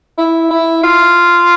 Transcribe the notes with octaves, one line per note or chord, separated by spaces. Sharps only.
E4
E4
F4